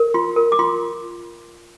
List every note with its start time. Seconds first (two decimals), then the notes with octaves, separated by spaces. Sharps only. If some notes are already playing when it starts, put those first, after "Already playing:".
Already playing: A#4
0.14 F4 C6
0.36 A#4
0.52 D6
0.59 F4 C6